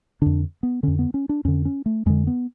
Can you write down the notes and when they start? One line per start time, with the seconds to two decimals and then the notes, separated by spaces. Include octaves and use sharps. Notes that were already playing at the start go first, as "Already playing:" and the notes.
0.22 F2 D3 D4
0.63 B3
0.83 F2 D3 C#4
0.99 B3
1.14 C#4
1.29 D4
1.45 F2 D3 C#4
1.65 C#4
1.86 A3
2.06 F2 D3 G#3
2.27 B3